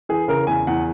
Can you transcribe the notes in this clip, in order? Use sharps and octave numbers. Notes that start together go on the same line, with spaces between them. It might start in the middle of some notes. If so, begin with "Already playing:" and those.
E3 G#4
C#3 A#4
E2 G#5
E2 F#5